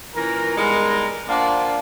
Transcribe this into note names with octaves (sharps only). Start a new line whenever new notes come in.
A#2 E3 C#4 A#4
G3 G#3 B3 D#4 A#4
A#3 D4 F4 C5 D5 F#5